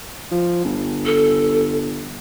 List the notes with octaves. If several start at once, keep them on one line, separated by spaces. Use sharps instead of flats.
F3
G1
A4